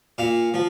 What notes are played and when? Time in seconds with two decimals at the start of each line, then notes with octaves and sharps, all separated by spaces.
0.18 A#2 F5
0.54 F3